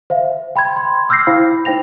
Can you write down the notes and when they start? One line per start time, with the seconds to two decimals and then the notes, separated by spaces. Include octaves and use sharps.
0.10 C5 E5 F5
0.56 G5 B5 C6 G#6
0.77 C6
1.09 D6 E6 F6 G6 A#6 C7
1.27 E4 C5 F5 G5 B5
1.65 D#4 C5 G5 A#6 F7